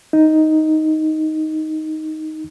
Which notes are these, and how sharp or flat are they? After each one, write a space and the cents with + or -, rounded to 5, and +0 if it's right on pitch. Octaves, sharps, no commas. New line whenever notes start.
D#4 +5